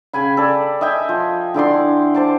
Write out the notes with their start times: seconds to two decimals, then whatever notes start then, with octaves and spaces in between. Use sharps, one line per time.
0.13 C#3 G5 G#5 B5
0.37 A4 D5
0.81 D#5 E5 G5 G#5
1.09 F3
1.54 D3 E4 D5 C6
2.14 C5 A5 D6